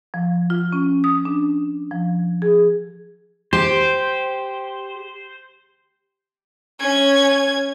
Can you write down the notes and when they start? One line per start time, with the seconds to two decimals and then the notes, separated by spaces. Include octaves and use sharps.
0.14 F3
0.50 F4
0.73 C#4
1.04 D#6
1.25 D4
1.91 F3
2.42 G#4
3.53 G4 C5
6.80 C#4 G#6